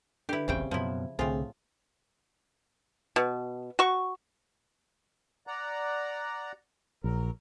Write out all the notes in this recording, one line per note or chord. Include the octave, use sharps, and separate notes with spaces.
D3 E4 G4 B4
F1 A#1 E2 C#3 G3 C4 G5
F#2 B2 F3 E4
C2 A2 D3 A3 C4 F4 G#4
B2
F#4 C#6
D5 F#5 A#5
A#1 F#3 A#4